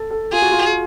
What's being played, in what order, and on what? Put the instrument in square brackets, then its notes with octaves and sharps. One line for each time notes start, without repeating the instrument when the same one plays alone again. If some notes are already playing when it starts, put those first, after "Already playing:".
Already playing: [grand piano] A4
A4
[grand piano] F4 [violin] G#4
[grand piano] F#4
F4